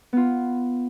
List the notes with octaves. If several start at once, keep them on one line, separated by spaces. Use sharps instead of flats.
B3 F4